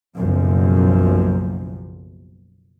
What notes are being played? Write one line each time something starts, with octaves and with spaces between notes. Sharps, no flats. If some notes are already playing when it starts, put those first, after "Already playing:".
F#1 B1 F#2 F3